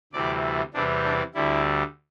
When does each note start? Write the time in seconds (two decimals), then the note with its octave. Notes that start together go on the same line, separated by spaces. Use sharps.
0.13 D2 C3 E3 G3 D5
0.73 E2 C3 E3 G3 D4
1.04 D4
1.34 D2 D3 G3 E4